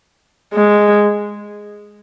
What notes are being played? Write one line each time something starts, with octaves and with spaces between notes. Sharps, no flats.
G#3